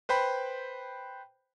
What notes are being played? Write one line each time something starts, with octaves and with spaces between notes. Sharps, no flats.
B4 C5 G5 B5